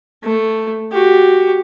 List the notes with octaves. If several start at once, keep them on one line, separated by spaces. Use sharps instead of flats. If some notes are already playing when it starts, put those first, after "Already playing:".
A3
F#4 G4